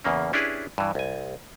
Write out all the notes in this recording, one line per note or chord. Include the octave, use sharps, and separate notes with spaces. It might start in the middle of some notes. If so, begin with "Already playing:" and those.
E2 C#3 A#3 C#4
C#4 D4 E4 G4 G#4 B4
G2 E3
C2 G#5